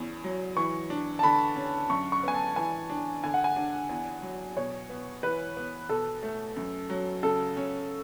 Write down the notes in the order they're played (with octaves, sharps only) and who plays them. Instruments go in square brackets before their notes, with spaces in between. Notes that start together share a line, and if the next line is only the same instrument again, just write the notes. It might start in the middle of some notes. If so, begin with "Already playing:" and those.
Already playing: [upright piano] E2 C#4
F#3
[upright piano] E3 [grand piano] C#6
[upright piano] D4
[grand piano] A5
[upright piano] D3 [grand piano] B5
[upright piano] C#4
[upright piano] F#2 [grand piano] C#6
[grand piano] C#6
[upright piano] B3 [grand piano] G#5
[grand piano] A5
[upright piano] E3 [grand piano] G#5
[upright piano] D4
[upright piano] D3 [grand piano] G#5
[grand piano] F#5
G#5
[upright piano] D4
E2
F#3
[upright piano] B2 [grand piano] C#5
[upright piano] B3
[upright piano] E3 [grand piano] B4
[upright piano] B3
[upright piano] B2 [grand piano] A4
[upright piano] A3
F#2
F#3
[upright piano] C#3 [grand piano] A4
[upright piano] C#4